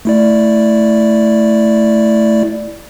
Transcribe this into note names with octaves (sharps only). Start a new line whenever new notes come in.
A3 E4 D5